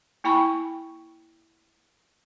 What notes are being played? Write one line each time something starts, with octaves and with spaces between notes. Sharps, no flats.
A#3 E4 G5 G#5 B5 C#6